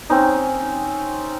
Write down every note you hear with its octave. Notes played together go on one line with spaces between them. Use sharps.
C4 C#4 D#4